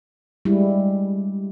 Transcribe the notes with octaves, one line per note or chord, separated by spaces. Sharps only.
G3 G#3 E4